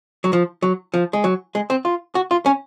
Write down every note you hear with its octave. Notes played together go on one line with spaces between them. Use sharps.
F#3
F3
F#3
F3
G#3
F#3
G#3
C4
F4
F#4
F4
C#4